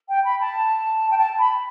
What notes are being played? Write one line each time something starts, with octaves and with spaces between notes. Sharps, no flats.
G5
B5
A5
G5
A5
B5